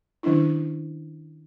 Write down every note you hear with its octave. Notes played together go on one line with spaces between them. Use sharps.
D#3 F#3 C#4 D4 E4